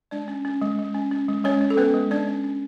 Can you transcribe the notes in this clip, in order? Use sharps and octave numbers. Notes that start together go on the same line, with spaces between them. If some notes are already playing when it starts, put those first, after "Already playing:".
G#3 D4 D5
C#4
C#4
G#3
G#3
C#4
C#4
G#3
G#3 C#4 C#5
C#4
A4
B3 C#4 B4
G#3
G#3 D4 D5
C#4
C#4